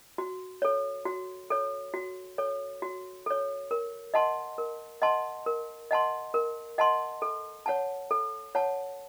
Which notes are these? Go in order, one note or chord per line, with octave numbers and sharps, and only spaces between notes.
F#4
A4 C#5
F#4
A4 C#5
F#4
A4 C#5
F#4
A4 C#5
A#4
D#5 F#5 A5 C6
A#4
D#5 F#5 A5 C6
A#4
D#5 F#5 A5 C6
A#4
D#5 F#5 A5 C6
A4
C#5 F#5 A5
A4
C#5 F#5 A5